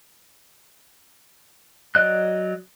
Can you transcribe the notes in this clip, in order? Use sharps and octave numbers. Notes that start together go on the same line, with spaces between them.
F#3 D5 D#5 F#6